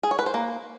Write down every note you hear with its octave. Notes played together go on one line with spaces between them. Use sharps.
G#4
C#5
B4
C5
A#3